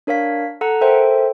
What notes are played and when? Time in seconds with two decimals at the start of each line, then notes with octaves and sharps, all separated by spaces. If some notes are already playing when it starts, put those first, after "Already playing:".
0.07 D4 A#4 C#5 F5 B6
0.61 A4 F#5 A#5
0.81 A4 A#4 C5 E5 G5